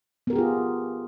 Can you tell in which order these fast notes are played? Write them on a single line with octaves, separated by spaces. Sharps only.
B3 A#4 G4 G#4 F4